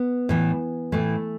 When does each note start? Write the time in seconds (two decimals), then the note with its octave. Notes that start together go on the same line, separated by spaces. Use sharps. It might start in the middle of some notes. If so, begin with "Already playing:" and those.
Already playing: B3
0.29 A2 E3
0.92 A2 E3 A3